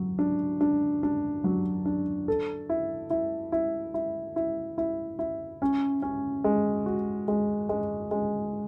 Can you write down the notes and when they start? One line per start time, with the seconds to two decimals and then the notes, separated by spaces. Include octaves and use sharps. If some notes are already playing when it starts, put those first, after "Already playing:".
Already playing: F#3
0.19 D4
0.61 D4
1.03 D4
1.44 F#3
1.85 D4
2.28 A4
2.69 E4
3.10 E4
3.52 E4
3.94 E4
4.36 E4
4.78 E4
5.19 E4
5.62 C#4
6.02 C#4
6.44 G#3
6.86 F#4
7.28 G#3
7.69 G#3
8.11 G#3